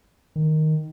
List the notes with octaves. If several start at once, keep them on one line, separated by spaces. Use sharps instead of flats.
D#3